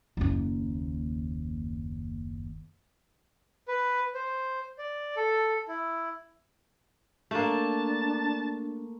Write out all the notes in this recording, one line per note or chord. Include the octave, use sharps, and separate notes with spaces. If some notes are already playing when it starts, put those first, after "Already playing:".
F#1 D#2
B4
C5
D5
A4
E4
A3 A#3 D4 A5